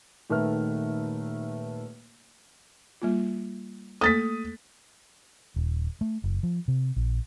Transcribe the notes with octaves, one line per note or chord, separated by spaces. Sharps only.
D#1 D#3 A3 B4 E5 F6
G3 A#3 F4
A3 A#3 A4 D#6 A6 B6
D#1
A3
F#1
F3
C3
A#1